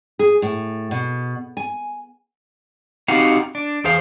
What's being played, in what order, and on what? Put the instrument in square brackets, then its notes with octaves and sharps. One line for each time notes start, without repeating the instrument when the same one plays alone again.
[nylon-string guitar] G#4
A2
B2
G#5
[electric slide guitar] C4 D#4 F#4 G4 F5 F#5
D4
E2 G#4 C5 F5